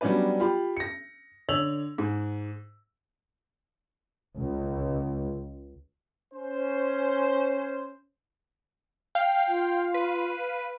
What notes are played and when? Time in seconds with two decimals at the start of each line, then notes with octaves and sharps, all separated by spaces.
0.01 F#3 G3 B3 C#4 D4 B4
0.40 F4 G4 B5
0.77 A#6 C#7
1.48 D3 C#5 E6 F7 F#7
1.98 G#2
4.37 C#2
6.33 C#4 C5
9.15 F5 G5
9.48 F4
9.94 B4